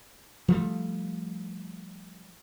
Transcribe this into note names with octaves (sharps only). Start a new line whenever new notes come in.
F3 G3 A3